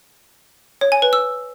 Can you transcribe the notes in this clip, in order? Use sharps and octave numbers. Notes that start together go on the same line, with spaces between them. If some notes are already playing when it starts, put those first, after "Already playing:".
C#5
G#5
B4
E6